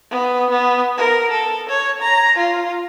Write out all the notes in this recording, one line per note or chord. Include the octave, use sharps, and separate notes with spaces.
B3
B3
A#4
A4
C#5
A#5
F4